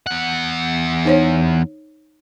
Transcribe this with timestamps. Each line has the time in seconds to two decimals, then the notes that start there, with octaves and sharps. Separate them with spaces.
0.06 E2 F#5
1.05 D#4 C5 C#5